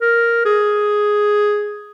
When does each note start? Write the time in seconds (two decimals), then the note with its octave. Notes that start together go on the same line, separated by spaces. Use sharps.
0.01 A#4
0.45 G#4